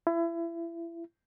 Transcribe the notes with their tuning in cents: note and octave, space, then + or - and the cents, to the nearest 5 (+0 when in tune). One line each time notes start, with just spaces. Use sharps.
E4 +30